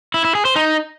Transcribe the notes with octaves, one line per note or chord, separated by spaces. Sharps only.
E4
E4
G#4
C5
D#4